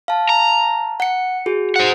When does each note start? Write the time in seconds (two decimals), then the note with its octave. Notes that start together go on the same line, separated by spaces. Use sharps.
0.08 F5 A5
0.29 A#5
1.00 F#5 C#7
1.46 F#4 G#4
1.76 C5 F#5